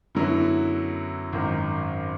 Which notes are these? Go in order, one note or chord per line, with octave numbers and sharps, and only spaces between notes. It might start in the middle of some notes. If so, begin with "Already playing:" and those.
F#2 D3 F#3 B3 E4
G#1 F#2 D#3